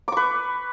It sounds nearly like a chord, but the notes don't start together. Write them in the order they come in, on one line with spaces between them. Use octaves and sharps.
D6 C#6 B4